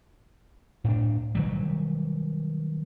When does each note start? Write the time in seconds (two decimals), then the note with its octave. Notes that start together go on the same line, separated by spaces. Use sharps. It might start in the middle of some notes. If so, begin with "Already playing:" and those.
0.84 A2 D4
1.35 D#3 F#3 G3